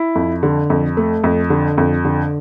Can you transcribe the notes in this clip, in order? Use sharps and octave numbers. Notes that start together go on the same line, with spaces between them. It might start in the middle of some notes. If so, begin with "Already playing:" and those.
Already playing: E4
F2
D3
F2
A3
F2
D3
F2
D3